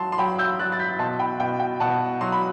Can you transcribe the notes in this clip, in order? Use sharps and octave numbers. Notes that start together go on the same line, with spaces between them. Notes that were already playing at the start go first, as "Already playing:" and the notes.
Already playing: F#3 A5 C6
C6
F#3 G5 B5
E6 G6
F#3 F#6 A6
A6
G6 B6
B2 A5 C6
G5 B5
B2 G5
G5
B2 F#5 A5
F#3 C6
B5